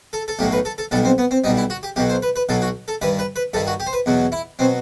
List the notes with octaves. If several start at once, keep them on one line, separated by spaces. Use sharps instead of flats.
A4
A4
B1 A2 F#3 G4
B4
A4
A4
B1 B2 G3 A4
C4
B3
C4
B1 B2 G3 D#4
E4
F#4
G4
B1 B2 F#3 G4
C5
B4
B4
B1 B2 F#3 A4
F#4
A4
G2 D#3 G3 B4
B4
B4
G2 D#3 G3 A4
F#4
G4
C5
B4
E2 B2 F#3
E4
B2 F#3 C4